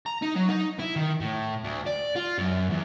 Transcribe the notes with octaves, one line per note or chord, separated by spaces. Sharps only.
A#5
D#4
F#3
D#4
E4
D#3
A2
D2
D5
F4
F#2
E2